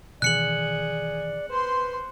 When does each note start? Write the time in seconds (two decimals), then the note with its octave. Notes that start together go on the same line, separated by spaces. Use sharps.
0.22 B2 D#3 E3 G#4 D5 F#6 C#7 F#7
1.50 B4 C5 C6